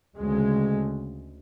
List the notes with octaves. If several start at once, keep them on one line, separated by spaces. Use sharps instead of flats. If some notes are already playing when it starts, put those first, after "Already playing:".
D2 C#3 G#3